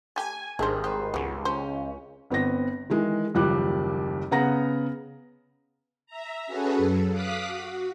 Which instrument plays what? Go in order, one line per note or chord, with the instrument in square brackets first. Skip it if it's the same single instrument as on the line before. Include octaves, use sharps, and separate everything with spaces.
[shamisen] A3 G4 [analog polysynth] G#5
[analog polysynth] G#1 D#3 [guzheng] G3 G#3 G#4 [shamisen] D4 C5
[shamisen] G4 [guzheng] B4 C5
[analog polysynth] C#2 [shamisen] B3 C#4
[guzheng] C#4 [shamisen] C5
[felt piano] G1 B3 C4 A#6
D#3 E3 G#3
F#1 D#2 F3 G3 D6 F#6
C#3 B3 F#5 A#5 A#6
[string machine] E5 A#5
C#4 F#4 G#4 A4 B4
F#2 A4
F5 D6 D#6 F#6 B6
F#4